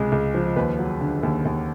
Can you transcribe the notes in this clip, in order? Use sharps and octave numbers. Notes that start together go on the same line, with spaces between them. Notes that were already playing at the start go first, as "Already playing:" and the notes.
Already playing: C#2 C3 G#3
C#2
F3
D#2 B4
F#3
D3
D#2
D#2